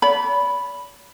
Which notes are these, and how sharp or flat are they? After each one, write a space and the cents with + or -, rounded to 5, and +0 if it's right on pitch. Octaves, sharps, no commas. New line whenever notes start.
D5 -45 B5 +0